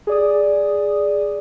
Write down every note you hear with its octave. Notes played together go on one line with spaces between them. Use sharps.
G#4 D5 D#6